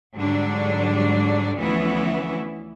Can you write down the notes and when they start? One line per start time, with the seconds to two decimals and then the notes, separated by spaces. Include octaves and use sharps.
0.15 G#2 D3 F#3 G3 D4
1.57 D2 E3 F3 B3 C#4 E4